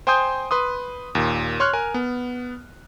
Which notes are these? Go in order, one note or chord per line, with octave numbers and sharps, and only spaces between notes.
C5 G5 G#5 C6 D#6 G6
B4 C6 D#6
D#2 A#2
C#5 C6 C#6 F6 F#6
A#4 G#5
B3